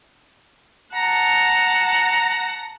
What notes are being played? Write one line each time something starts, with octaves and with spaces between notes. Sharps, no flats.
F#5 A5 A#5